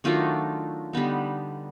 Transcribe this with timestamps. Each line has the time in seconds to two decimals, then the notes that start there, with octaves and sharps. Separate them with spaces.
0.04 D#3 F#3 A3 D4 D#4 F4
0.93 D3 G3 B3 D#4